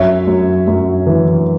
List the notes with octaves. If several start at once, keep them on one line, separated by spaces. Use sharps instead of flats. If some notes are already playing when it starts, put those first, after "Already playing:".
Already playing: F#2 C#5 E5
F#2
F#2
E3